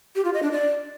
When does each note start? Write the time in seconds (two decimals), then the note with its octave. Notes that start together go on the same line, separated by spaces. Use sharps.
0.16 G4
0.25 F4
0.34 D#5
0.43 D4
0.52 D5